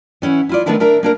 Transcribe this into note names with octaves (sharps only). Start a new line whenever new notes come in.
E3 C#4 E4 F#5
E4 F4 D5
D#3 F3 A3 B3 D4 E4
D4 A#4 E5 A#5
A#3 D4 A#4